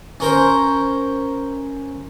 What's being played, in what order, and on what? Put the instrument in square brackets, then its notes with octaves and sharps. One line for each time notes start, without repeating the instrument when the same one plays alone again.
[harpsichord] C#4 A#4 C5